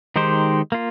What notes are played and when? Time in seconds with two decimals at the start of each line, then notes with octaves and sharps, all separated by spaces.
0.16 D#3 G#3 D#4 G4 C5
0.72 A#3 F4